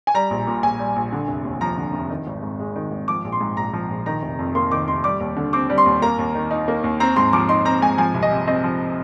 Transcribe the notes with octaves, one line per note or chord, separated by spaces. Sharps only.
G#5
G3 A#5
A#1
A#2
A#1 G#5
G3
A#1
D3
F1
D#2
F3 A#5
D3
F1
D#3
G#1
G#2
G#3
D#3
G#1
F3 D6
A#1
C6
G#2
A#1 A#5
F3
A#1
D#3 A#5
F1
F2
A#3 C6
D#3 D6
F1 C6
G3 D6
D#2
D3
C4 D6
G3
C6
D#2
A#3 A#5
D#2
D#3
D#4
A#3
D#2
C4 A#5
G#2 C6
F3 D6
D#4 C6
C4 A#5
G#2 G#5
F3 G#5
C2
D#5
C3
C4 D#5
F3